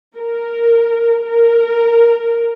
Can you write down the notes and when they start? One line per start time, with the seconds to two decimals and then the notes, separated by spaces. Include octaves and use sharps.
0.17 A#4
1.27 A#4